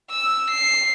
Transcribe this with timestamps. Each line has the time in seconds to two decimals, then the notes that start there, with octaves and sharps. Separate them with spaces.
0.11 E6
0.50 C7